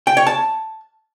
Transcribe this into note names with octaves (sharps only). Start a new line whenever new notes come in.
G5
C#5
A5